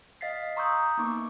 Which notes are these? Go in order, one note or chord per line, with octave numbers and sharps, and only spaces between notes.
D#5 F5 A6 B6 C7
A#5 C6 C#6 D#6 E6 G6
A#3 B3 D#4 C#6 D6